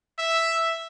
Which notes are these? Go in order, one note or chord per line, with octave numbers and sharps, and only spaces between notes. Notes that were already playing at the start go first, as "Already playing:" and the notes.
E5